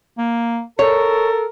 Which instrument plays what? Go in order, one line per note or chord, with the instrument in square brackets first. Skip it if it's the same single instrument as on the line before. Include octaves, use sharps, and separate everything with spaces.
[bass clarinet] A#3
[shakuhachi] A4 [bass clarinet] A#4 [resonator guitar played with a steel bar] C#5